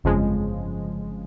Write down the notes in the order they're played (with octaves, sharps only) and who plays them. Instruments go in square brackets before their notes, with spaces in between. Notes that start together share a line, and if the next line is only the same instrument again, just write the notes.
[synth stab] G1 F2 C#3 F3 G#3